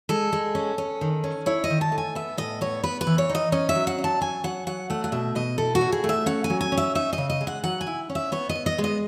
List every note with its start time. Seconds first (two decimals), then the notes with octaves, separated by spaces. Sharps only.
0.09 G#3 A4
0.33 G#3
0.55 C#4
0.78 C#4
1.01 D#3
1.24 C#4
1.46 E4 C#5
1.64 D#5
1.70 D#3
1.81 A5
1.92 A3
1.98 G#5
2.15 B3 E5
2.37 A2 D#5
2.61 B3 C#5
2.84 B3 B4
3.01 B4
3.07 E3
3.18 C#5
3.29 D#4
3.35 D#5
3.52 C#4 D#5
3.69 E5
3.75 F#3
3.87 F#5
3.98 C#4
4.04 A5
4.21 F#3 G#5
4.44 F#3 F#5
4.67 F#3 F#5
4.90 A3 F#5
5.04 F#5
5.12 B2 E5
5.35 B2 D#5
5.58 E4 A4
5.75 F#4
5.81 A2
5.92 G#4
6.04 A3
6.09 E5
6.26 C#4 F#5
6.44 G#5
6.50 F#3
6.61 G#5
6.72 C#4
6.77 E5
6.95 D#4 E5
7.13 D#5
7.18 C#3
7.30 D#5
7.41 G#3
7.47 F#5
7.64 F#3 F#5
7.81 G#5
7.87 E4
8.10 C#4
8.15 E5
8.32 B3 C#5
8.49 D#5
8.55 B3
8.66 D#5
8.78 G#3
8.84 D#5